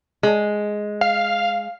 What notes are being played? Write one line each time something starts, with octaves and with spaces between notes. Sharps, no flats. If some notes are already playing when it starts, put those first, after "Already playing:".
G#3
F5